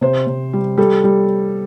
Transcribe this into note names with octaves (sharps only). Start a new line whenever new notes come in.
C3 C5
C3
G3
G3 A4
G3